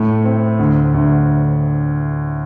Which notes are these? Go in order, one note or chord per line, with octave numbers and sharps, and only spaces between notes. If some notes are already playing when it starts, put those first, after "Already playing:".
Already playing: A2 A3
C4
D2
D2